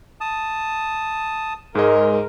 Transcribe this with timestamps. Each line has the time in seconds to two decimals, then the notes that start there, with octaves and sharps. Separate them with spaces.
0.21 A5 D#6
1.75 G#2 G#3 G#4 A#4 D#5